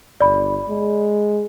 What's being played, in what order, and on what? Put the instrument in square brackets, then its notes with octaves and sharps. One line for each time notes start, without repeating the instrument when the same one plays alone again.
[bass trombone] G1 [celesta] D5 B5
[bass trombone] G#3